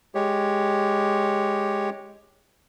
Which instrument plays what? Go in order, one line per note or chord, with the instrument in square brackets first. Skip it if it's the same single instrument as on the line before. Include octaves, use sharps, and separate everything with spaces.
[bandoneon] G#3 G4 C#5